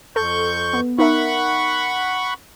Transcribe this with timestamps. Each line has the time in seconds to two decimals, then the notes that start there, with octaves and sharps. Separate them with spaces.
0.16 F2 A4 C#6 G6
0.73 B3
0.99 D#4 A#4 E5 F#5 B5 C#6